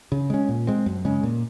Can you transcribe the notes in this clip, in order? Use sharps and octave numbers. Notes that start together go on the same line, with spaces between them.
C#3
G#3 C#4
A#2
G#3 C4
F#2
C#3 G#3 C#4
A#2